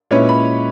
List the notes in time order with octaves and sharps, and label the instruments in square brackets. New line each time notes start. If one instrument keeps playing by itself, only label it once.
[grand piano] A#2 G#3 C#4 E4 B4 [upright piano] C#5
[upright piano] B5